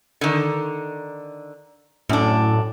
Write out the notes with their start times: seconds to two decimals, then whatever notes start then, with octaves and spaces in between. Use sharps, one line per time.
0.21 D3 D#3
2.09 F#2 A2 D4